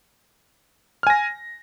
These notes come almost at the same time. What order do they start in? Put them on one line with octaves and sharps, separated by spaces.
F6 G#5 A#6